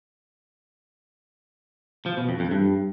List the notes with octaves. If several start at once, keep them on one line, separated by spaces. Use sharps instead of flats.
F3
B2
F2
F2
G2